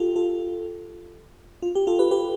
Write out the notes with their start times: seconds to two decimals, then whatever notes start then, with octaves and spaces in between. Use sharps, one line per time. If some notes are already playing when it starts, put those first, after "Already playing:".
Already playing: F4 G4 A4
0.16 F4 A4
1.62 F4
1.75 G4
1.87 F4 A4
1.99 G4 B4
2.11 G4 B4